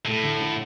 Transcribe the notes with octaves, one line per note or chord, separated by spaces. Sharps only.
A2 A3
D3
D3